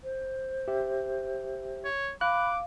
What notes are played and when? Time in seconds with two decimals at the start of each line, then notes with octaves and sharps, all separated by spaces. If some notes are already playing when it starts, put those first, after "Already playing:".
0.04 C5
0.68 G4 E5
1.85 C#5
2.21 F5 B5 D6 F#6